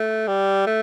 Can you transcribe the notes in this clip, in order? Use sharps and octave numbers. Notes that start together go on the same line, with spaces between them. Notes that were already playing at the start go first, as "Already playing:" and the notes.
Already playing: A3
G3
A3